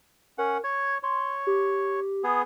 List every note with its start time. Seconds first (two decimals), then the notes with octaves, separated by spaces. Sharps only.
0.38 C#4 A#4 F#5
0.64 C#5 G#6
1.03 C#5 C6
1.47 G4
2.24 B3 G#4